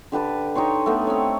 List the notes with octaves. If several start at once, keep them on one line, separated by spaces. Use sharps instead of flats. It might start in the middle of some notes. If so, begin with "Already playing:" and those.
D3 G4 B4 A5
D#4 G4 C#5 C6
A3 B3
C4 C#5